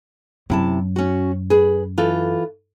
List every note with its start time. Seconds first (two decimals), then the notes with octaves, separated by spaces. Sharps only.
0.50 F#2 C3 E4 A5
0.96 C#4 F#4
1.50 G#4 B4
1.98 E3 F4 A4